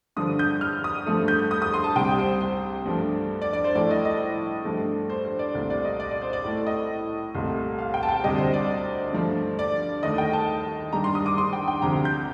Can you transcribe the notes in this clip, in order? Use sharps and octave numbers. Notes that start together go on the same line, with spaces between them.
G2 D3 F3 D#6
G6
F6
D#6
G2 F3 A3
G6
D#6
D#6
C6
A5
C2 C3 G3 G5
C5
C5
G2 F3 A3
D5
D5
C5
A2 F3 A3 D5
D#5
D#5
G2 F3 A3
C5
C5
D5
C2 A#2 A3
D5
D#5
D5
D5
C5
D5
A2 A3
D#5
C2 A#2 A3
F5
G5
A5
G5
D2 C3 G3 D#5
C5
D5
G2 F3 A3
D5
D#2 D#3 A3 D#5
G5
A5
G2 D#3 G3 A#5
C6
D#6
D6
C6
G5
G5
D2 C3 F3 A#5
G6